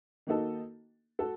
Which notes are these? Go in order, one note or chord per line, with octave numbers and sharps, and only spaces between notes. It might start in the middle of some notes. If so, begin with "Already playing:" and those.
D#3 A#3 D#4 F#4 A4
F#4 A4